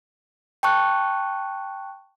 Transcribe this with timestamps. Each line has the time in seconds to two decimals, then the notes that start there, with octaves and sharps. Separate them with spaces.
0.63 G5 A5 C#6 F#6